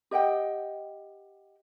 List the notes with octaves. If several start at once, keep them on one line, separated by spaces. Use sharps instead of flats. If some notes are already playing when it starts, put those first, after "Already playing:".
G4 D#5 F#5 G5